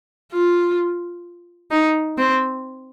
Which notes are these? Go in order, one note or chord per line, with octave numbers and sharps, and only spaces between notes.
F4
D#4
C4